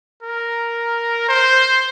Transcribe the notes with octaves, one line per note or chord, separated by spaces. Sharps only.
A#4
C5